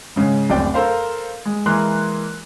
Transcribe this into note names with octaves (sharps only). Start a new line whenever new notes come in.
G#2 C#3 G#3
D1 F#2 A2 C4 D5 G5
A4 A#4 C5 F5
G#3
E3 G#3 A#3 A#4 C6 F#6